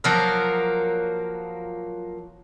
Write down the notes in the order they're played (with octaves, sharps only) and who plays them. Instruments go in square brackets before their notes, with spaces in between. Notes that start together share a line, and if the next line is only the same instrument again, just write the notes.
[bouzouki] F3 F#3 A#3 A#4